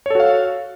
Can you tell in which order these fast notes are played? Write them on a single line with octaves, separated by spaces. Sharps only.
C#5 A4 F#4 F5